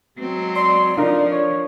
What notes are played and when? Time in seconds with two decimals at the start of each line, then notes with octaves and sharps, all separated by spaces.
0.18 F#3 G#3 C4
0.55 D5 C6
0.96 F3 D4 D#4 F4 A#4
1.31 C#5